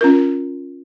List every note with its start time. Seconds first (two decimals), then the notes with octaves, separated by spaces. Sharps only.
0.01 C#4 F4 A#4